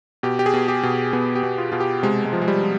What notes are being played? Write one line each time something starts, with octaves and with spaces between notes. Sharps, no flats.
B2 G4
G4
G#4
B2
G4
B2
B2 B3
G4
B2
F4
B2 F4
G4
C3 G#3
G#3
F3
G#3
G3
F3